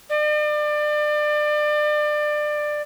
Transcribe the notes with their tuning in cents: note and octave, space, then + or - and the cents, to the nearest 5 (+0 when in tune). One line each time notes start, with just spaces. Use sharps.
D5 +30